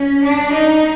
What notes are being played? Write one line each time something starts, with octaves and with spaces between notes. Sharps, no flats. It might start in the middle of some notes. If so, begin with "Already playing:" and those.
Already playing: C#4
D4
D#4